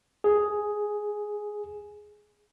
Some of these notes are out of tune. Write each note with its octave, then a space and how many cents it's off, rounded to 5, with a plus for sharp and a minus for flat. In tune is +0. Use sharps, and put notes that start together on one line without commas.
G#4 +5